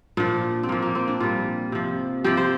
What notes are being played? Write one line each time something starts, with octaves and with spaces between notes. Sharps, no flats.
A#2 F3 D4
C4
A#2 F3 A#3
A#3
C4
D4
A#2 G3 F4
C3 F3
C3 F3 G4
C5